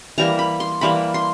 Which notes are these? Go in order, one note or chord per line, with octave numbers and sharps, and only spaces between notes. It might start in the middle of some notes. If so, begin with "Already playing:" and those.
E3 G3 A#3 A#5
B5
C6
E3 G3 A#3 B5
C6